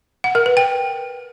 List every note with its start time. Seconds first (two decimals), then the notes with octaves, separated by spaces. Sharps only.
0.24 F#5
0.35 A#4
0.46 B4
0.57 G5